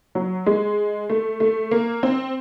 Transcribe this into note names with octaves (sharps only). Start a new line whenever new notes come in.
F#3
G#3
A3
A3
A#3
C4